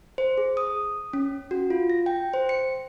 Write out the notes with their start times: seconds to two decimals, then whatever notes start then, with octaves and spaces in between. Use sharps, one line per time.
0.18 C5
0.38 G#4
0.57 D#6
1.13 C#4
1.51 F#4
1.70 F4
1.90 A#6
2.06 G5
2.33 C5
2.49 C#7